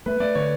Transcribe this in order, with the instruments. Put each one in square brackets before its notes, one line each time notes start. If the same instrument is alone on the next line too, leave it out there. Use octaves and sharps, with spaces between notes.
[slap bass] A3 [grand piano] B4
[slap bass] A3 [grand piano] D5
[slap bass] D3 [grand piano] C#5